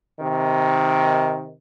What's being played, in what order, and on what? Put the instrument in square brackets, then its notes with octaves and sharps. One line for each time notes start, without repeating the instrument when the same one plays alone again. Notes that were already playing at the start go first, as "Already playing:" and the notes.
[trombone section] C3 D#3